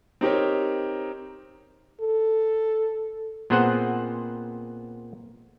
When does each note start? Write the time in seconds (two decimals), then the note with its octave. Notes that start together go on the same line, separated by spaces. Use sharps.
0.21 C4 D#4 G4 A#4 C#5
2.01 A4
3.50 A#2 B3 C4 G#4 C5 F#5